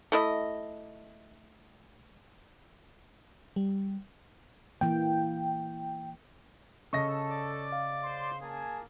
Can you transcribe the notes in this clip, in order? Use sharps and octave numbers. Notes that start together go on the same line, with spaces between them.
A3 E4 D#5
G3
E3 A#3 G5
C#3 A4 D#5 C#6 A#6
D5 D6
F5
C5 C6
A#3 G#4 G#5 A5